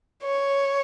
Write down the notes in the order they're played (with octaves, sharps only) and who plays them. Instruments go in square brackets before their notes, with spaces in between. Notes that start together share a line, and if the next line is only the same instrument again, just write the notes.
[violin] C#5